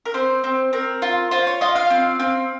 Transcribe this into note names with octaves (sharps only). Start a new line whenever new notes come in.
A#4
C4 C5
C4
C4 A#4
F4
F4 C5
C#5
F4 D#5
F5
C4
C4